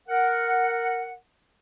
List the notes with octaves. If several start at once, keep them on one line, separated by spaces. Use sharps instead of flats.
A#4 F#5